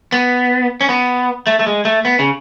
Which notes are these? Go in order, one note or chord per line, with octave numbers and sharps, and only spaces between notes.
B3
C#4
B3
A3
A3
G#3
A3
B3
C#3